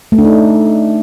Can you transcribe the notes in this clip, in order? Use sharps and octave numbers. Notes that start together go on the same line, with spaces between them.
A3
D4
D#4